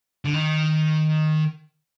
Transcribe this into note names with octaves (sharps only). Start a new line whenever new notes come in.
D3
D#3